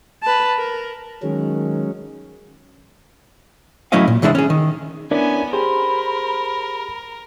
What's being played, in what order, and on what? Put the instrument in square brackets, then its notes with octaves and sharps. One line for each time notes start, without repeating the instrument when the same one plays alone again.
[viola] B4 A5
A#4
[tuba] D#3 [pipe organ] F#3 G#3 C#4
[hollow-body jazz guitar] F#3 A3 C#4 E4 D#5 F5
A#2
C2 E3 G#3 D4 B4 E5
C#4 G#4
D#3
[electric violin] B3 G#5 [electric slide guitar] C#4 E4 [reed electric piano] D4 A#4 D5
[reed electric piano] G4 G#4 [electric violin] A#4 [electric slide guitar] C5 [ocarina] B5